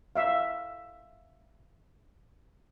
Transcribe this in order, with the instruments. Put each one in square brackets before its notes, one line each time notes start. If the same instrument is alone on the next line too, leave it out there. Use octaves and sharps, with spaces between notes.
[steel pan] E5 F5